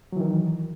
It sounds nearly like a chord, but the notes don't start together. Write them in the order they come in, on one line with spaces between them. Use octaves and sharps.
F#3 E3 D#3